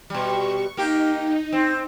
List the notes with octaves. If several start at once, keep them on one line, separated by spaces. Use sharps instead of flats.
B2 G3 C#6
A#3 D#4 G4
C4